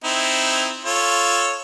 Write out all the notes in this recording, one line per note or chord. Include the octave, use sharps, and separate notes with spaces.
C4 D#4 E4
F4 A4 C#5